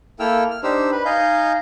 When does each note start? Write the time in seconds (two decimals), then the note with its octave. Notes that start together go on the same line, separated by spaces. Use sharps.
0.20 A#3 E4 A4 G5 E6 F6
0.50 F6
0.63 D4 D#4 G4 C5 E6
0.91 B4 B5
1.05 D#4 D#5 F5 G#5 G6